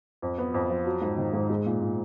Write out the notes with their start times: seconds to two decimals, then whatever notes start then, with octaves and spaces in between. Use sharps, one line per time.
0.22 F2
0.38 B3
0.54 F2
0.70 F3
0.86 F#3
1.02 G#2
1.18 D#3
1.33 G#2
1.50 G#3
1.66 A#2
1.81 A#2